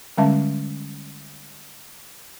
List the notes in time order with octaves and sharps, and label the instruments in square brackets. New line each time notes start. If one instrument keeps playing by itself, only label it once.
[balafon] D3 G3 G#3 C#4 E5 A5